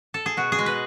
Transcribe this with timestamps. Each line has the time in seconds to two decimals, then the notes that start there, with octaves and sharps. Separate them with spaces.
0.14 A4
0.26 G#4
0.37 B2 F#4
0.52 G#4
0.59 G#3
0.66 B4